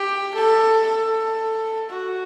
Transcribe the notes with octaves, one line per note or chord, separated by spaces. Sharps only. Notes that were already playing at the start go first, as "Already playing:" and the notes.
Already playing: G4
A4
A4
F#4